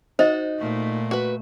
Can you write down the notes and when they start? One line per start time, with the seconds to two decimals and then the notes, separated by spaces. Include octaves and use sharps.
0.19 D#4 F#4 C5 D#5
0.58 A#2 A3
1.11 F#4 B4